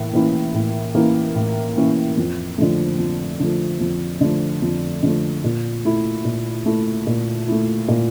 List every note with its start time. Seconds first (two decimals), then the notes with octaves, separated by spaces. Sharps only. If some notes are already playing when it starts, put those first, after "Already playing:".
Already playing: A2 E3 A#3
0.13 E3 A#3 C#4 E4
0.54 A2
0.95 E3 A#3 C#4 E4
1.35 A2
1.76 E3 A#3 C#4 E4
2.17 F2
2.58 D3 F3 A3
2.99 F2
3.40 D3 F3 A3
3.80 F2
4.21 D3 F3 A3
4.62 F2
5.03 D3 F3 A3
5.44 A#2
5.85 A3 E4
6.25 A#2
6.66 A3 E4
7.07 A#2
7.48 A3 E4
7.88 A#2